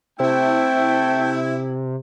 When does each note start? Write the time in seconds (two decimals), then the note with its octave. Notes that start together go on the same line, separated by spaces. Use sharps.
0.20 C3 A3 E4 C5 G5